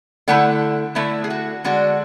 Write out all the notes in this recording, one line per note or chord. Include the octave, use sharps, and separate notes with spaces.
D3 A3 E4 F#5
D3 A3 E4 E5
G#4
F#4
D3 G#3 D4 F#4